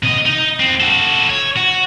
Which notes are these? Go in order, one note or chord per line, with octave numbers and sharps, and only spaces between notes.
C3 D#5
D#4
C4 F4
F#4 A4
C#5
F#4